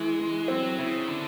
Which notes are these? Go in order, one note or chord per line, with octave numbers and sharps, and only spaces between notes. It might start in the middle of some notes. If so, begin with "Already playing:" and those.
Already playing: E3 G#3
E3
F#3 C4
C#3 E4
D3